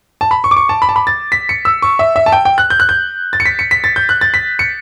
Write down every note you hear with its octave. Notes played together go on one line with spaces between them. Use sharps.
A5
B5
C#6
D6
C#6
A5
B5
A5
B5
A6
B6
C#7
E6
C#6
E5
E5
A5
G5
G5
F#6
G6
F#6
G6
A6
C#7
B6
C#7
B6
A6
G6
F#6
A6
B6
C#7